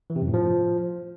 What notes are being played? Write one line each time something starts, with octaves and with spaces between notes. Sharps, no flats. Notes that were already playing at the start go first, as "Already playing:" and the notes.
E3
C3
F#2
A2
F3